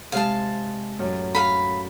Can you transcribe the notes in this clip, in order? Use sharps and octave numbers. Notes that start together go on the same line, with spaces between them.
C3 G#3 F5 A5
F#2 A2
F5 B5